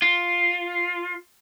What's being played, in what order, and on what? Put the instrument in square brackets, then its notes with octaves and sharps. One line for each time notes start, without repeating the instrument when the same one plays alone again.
[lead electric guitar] F4